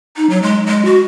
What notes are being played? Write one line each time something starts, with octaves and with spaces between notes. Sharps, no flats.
D#4
F#3
G#3
G#3
F#4